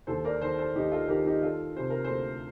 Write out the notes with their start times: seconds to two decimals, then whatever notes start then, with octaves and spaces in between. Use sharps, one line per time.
0.07 D#2 A4 C5
0.25 A#4 D5
0.41 D#3 A4 C5
0.58 A4 C5
0.75 D#2 D#4 G4
0.91 F4 A4
1.08 D#3 G4 A#4
1.25 D#4 G4
1.42 D#3 F4 A4
1.76 C3 C5
1.90 A#4
2.04 A4 C5
2.10 D2